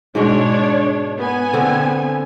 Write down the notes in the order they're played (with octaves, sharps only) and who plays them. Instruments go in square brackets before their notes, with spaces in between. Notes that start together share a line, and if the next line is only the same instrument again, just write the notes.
[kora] G#2 B2 G#3 [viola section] D4 C#5
[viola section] B3 G#5
[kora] D3 C4